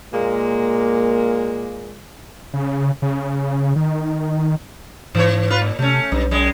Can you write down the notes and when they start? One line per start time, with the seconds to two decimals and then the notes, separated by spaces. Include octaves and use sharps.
0.12 A#2 G#3 A#3
2.54 C#3
3.02 C#3
3.76 D#3
5.15 G#2 E3 C#5
5.50 F4 B4
5.62 A#2
5.79 C3 A3 C#4
6.12 B1 G2
6.31 F#2 G#3